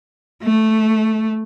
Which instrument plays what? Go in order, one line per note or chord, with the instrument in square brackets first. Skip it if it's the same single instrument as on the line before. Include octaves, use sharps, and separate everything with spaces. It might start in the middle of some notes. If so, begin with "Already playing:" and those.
[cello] A3